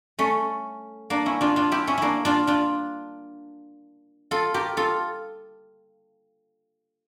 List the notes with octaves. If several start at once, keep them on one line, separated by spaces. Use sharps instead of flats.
A3 C#4
A#3 D4
C#4 E4
D4 F4
D4 F4
E4 G4
C#4 E4
A#3 D4 E4
D4 F4
D4 F4
F4 A4
G4 A#4
F4 A4